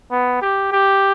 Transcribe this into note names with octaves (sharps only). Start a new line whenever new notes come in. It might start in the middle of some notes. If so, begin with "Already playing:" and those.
B3
G4
G4